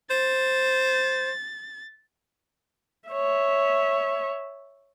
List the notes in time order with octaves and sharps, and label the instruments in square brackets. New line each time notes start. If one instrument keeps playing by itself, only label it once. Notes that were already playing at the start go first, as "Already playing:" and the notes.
[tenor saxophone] C5 [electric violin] A6
[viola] C#5 E5